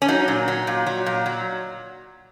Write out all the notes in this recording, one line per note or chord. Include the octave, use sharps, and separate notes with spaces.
C#4
F#3 D#4
A#2
F#3
A#2
F#3
A#2
F#3